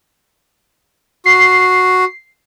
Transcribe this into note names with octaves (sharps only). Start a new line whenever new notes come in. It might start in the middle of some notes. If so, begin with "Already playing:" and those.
F#4 C7